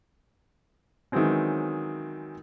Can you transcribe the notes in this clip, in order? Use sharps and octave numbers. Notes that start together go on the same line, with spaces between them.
D#3 E3 F#3 G#3 C4 C#4